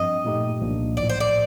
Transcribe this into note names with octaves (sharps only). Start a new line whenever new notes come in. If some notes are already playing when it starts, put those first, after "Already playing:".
Already playing: G2 F3 C4 D#5
A#2 A3 D#4 G4
C2 A#2 F3 A#3 D4
A1 A2 F3 D5
C5
D5